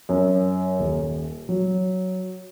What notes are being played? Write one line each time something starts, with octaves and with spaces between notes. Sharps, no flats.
F#2
D#1
F#3